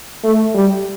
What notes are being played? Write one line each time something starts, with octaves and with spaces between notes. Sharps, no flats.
A3
G3